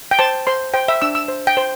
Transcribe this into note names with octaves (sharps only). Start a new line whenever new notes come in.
G5
C5 A5
C5 C6
C5 G5
E5
D4 E6
E6
C5
G5
C5